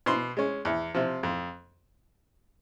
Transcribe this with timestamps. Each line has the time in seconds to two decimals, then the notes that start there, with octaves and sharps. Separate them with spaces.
0.06 B2 C6
0.37 G#3 C#4
0.65 E2
0.95 C3 F3
1.23 F2